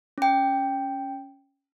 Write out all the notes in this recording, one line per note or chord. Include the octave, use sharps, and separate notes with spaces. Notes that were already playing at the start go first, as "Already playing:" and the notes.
C#4 G5